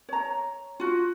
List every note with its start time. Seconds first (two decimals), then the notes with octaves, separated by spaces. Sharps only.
0.09 C#5 A#5
0.80 F4 F#4